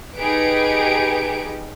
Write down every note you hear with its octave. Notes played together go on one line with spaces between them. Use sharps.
D#4 G4 G#4 B4 C#7 D7